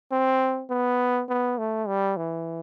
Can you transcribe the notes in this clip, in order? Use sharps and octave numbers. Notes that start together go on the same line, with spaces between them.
C4
B3
B3
A3
G3
E3